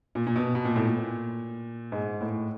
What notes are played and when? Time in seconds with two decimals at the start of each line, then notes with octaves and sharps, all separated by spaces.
0.15 A#2
0.27 A#2
0.36 B2
0.55 B2
0.65 A#2
0.76 A2
0.85 A#2
1.92 G#2
2.21 A2